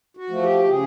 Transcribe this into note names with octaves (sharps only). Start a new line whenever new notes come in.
F#4
F3 A3
G4
C#3 G#4